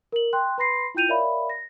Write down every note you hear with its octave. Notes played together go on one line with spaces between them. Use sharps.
A#4 F#7
G5 C6 F#6
B4 B5 C6 A#6 C7
E4 F4 G5 G6 D#7 F7
A#4 C#5 D5 E5 F5 B5
A#6